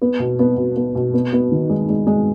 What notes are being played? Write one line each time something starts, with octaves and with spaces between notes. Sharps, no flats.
B3
B2
B3
B2
B3
B2
B3
B3
D#3
G#3
G#3
G#3